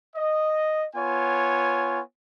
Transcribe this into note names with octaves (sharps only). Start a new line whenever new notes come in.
D#5
B3 F4 C#5 G#5